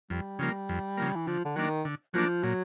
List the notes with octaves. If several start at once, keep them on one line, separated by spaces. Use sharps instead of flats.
F2 G3
C#3 F3 A#3
F2
C#3 F3 A#3
E3
D3 F3
D3
D#3 F#3 A#3 D4
D3
F3 F#3 A#3 D4
A#2 F#3